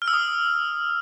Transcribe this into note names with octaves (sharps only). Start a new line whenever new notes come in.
F6
E6
D#6